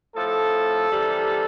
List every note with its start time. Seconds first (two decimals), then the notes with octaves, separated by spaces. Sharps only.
0.16 A2 F3 A4
0.90 C3 E3 G3